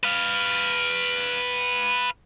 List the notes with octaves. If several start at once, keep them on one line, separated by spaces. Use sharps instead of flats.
B4 F5